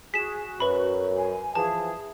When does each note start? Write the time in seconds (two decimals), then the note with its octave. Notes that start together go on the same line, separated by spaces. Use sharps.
0.14 F#4 G#4 B6 E7
0.60 F#2 B4 B5
1.17 G#5
1.55 E3 F3 G#4 A5